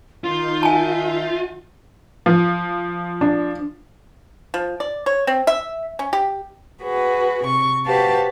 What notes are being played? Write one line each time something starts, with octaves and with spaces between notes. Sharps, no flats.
D#3 D#4 F4 C6 G6
E5 G#5 A5
F3
D4
F3
D5
C#5
C4
E5
C#4
G4
F#4 G#4 B4
C3 C#6
F#4 G4 B4 C5 F5 A5